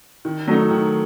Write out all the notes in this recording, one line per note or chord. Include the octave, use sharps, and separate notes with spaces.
D#3
F#3 A3 D#4
D#3